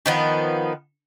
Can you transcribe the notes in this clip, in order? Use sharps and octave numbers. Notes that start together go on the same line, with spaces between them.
D#3 F3 B3